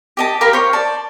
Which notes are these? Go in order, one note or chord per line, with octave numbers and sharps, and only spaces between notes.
G4 D#5 A5
G4 A#4 F5 B5
C5 C#5
D5 A5